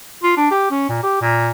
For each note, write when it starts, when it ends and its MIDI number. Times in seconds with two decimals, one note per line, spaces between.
0.23 0.33 65
0.37 0.48 62
0.51 0.67 67
0.71 0.86 61
0.89 1.03 46
1.03 1.20 67
1.22 1.51 46